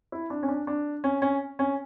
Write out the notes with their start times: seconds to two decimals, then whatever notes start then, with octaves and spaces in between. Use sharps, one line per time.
0.12 E4
0.30 D4
0.43 C#4
0.49 D4
0.67 D4
1.04 C#4
1.22 C#4
1.59 C#4